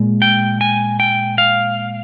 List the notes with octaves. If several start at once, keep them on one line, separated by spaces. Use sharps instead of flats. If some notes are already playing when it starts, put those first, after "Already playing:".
Already playing: A#2 G#3
G5
G#5
G5
F5